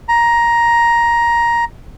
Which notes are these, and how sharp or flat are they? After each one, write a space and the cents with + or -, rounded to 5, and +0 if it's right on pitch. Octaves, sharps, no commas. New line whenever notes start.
A#5 +10